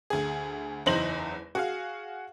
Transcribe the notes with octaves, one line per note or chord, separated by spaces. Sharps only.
D2 G#4
F#1 E2 D#4 C5 A#6 F#7
F#4 G#4 F5